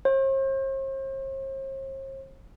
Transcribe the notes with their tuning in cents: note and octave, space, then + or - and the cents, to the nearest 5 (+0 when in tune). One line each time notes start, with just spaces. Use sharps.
C5 +45